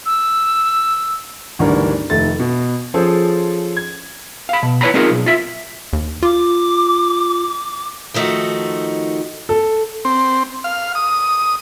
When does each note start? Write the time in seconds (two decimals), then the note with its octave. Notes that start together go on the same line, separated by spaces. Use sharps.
0.06 E6
1.59 G#1 D2 E3 G3 D4 A#4
2.10 F1 D#2 A3 A6
2.40 B2
2.94 F3 C#4 G#4 A4 C5
3.77 G#6
4.49 F5 B5
4.63 B2
4.81 E4 B4 C#5 A#5 B5
4.94 G#3 C4 D#4 F4 G#4 A#4
5.10 B1
5.26 F4 E5
5.93 D#2
6.23 F4 D6
8.14 D#3 F3 A3 D#4 F#4
9.49 A4
10.05 C4
10.64 F5
10.95 D#6